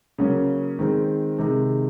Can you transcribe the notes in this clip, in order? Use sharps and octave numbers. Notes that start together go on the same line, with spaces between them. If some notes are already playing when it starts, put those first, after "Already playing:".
C#3 F#3 A#3 C#4
D#3 G#3 C4
C3 D#3 G#3